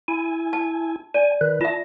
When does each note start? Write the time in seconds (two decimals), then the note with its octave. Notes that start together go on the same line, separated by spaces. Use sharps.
0.08 E4 G#5
0.53 A5
1.14 D5 G#5
1.41 D#3 B4
1.61 F4 E5 A5